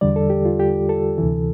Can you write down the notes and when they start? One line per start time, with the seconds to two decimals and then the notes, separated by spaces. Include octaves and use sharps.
0.01 E2 D3 G3 D5
0.16 A4
0.30 G4
0.45 F4
0.59 G4
0.89 A4
1.18 D2 C3 E3